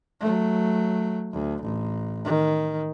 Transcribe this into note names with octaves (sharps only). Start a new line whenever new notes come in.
F#3 A3
D2
A1
D#3